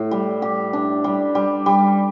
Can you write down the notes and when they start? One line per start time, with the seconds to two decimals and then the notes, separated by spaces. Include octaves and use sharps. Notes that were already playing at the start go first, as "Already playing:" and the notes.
Already playing: A2
0.11 G3
0.42 G4
0.73 D4
1.04 G3
1.35 G3
1.66 G3